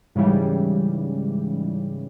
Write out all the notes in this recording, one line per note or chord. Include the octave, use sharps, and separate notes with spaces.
G#2 C#3 E3 G3